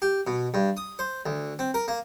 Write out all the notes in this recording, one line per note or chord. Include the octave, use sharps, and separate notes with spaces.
G4
B2
G2
D#6
C5
D2
C4
A#4
A#3